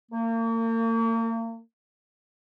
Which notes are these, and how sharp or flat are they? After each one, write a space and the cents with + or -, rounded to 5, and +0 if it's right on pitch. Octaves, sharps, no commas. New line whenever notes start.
A#3 -40